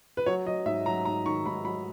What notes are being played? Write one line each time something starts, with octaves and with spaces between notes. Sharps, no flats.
B4
F#3 C#5
F#3 D#5
G#2 E5
F#3 A#5
G#2 A#5
D#3 C#6
G#2 B5
F#3 B5